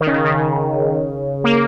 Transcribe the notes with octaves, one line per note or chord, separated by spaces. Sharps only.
D#3
C#3
D#3
C#3
C#3
A#3